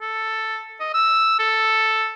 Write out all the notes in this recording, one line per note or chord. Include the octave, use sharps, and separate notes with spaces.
A4
D#5
E6
A4